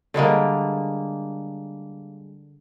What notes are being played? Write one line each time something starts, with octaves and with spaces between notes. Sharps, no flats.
D3 G3 G#3 A#3